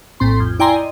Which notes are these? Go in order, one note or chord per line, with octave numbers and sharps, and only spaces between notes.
A#1 A2 C4 C6
F2
E4 D5 G5 G#5 A#5 C6
D#5